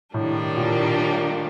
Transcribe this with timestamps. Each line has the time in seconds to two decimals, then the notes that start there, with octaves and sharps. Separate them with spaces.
0.14 A2 D#3 G3 A#3 D4
0.57 A#2